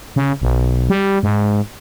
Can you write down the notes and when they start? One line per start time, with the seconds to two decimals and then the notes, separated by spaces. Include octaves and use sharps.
0.16 C#3
0.42 B1
0.90 G3
1.23 G#2